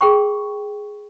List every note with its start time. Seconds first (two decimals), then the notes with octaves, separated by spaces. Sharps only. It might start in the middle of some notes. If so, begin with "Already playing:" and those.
0.01 G#4 A#4 G5 B5 C#6